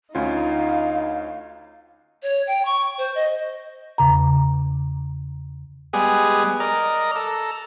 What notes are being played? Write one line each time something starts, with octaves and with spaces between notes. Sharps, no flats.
D2 C#4 D#4 F4 F5
C#5
G5
C#6
C5
D#5
E2 C#3 A#5
G3 G#3 B3 G#4
A#4 D5 D#5 A#5
A4 A#5